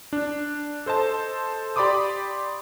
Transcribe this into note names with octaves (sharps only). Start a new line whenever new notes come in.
D4
A4 C5 D#5 A5
G4 D5 B5 C6 D6 D#6